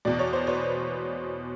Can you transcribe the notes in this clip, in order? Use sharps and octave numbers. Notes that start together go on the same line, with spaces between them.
E2 B2 D5
C#5
C5
B4 C#5